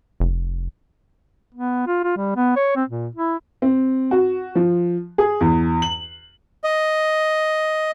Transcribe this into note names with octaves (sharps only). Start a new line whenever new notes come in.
F1
B3
F4
F4
G3
B3
C#5
C4
A#2
E4
C4
F#4
F3
G#4
E2
F#7
D#5